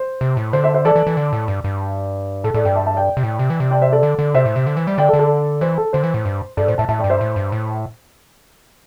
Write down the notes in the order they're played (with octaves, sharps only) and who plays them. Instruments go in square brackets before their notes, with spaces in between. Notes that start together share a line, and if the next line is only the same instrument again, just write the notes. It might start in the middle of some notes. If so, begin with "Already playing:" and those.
Already playing: [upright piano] C5
[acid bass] C3
A2
[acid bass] D3 [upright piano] C5
[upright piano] C5 E5
C5 E5
[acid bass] E3 [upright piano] A4 D5
[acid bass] E3
E3
D3
A2
G2
G2
[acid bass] A2 [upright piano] A4
[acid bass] A2 [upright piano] A4 D5
[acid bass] G2 [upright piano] D5 G5
[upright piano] E5 A5
E5 A5
D5 G5
[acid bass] C3
A2
C3
E3
C3
[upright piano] D5 G5
C5 E5
A4 D5
[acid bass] D3
D3
[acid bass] C3 [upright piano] C5 E5
[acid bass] A2
C3
D3
E3
G3
[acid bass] D3 [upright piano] D5 G5
[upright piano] A4 D5
[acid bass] D3
[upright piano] A4 D5
[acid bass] E3 [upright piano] C5
[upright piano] A4
[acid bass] D3 [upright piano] C5
[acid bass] E3
A2
G2
[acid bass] G2 [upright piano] A4 D5
[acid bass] A2 [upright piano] C5
[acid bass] A2 [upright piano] E5 A5
[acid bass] A2 [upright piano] E5 A5
[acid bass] G2 [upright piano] D5 G5
[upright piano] C5 E5
[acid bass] A2
G2
A2